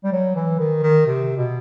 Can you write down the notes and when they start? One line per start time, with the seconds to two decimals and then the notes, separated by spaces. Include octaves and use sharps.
0.04 G3
0.12 F#3
0.36 E3
0.59 D#3
0.83 D#3
1.06 C3
1.37 B2